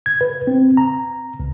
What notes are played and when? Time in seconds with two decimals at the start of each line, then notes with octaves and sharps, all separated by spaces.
0.06 G#6
0.21 B4
0.47 C4
0.77 A#5
1.40 C#2